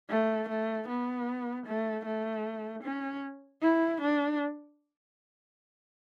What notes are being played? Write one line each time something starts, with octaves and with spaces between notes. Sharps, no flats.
A3
A3
B3
A3
A3
C#4
E4
D4